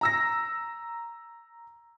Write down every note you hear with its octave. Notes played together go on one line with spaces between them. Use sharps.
A#5 E6 A#6